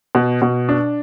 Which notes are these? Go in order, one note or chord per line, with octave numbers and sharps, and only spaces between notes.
B2
B2
D4